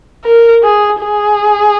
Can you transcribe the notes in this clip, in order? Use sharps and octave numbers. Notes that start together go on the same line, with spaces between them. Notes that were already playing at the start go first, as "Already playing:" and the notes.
A#4
G#4
G#4